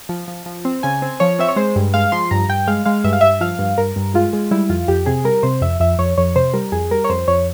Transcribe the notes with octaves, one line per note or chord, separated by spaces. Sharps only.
F3
F3
F3
C4
C#3 G#5
C4
F3 C#5
C4 E5
C#5
G#3 C5
G2
G#3 F5
F3 C6
G2 A#5
G2 G5
G#3 F5
G#3 F5
G2 E5
F5
G2 E5
F3 F5
G2
G2 A#4
G2
G#3 F4
G#3
G3 E4
F2 F4
F2 G4
C3 G#4
G3 A#4
C3 C5
F2 E5
F2 E5
F2 C#5
F2 C#5
C3 C5
G3 A#4
F2 G#4
G3 A#4
C#5
F2 C5
F2 C#5